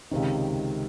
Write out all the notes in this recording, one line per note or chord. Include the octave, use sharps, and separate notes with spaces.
C#2 C3 D#3